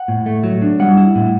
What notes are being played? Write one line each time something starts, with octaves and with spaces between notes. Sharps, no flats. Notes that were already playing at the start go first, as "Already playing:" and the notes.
Already playing: F#5
A2
A3
F#3
D4
G3 F#5
E4
A2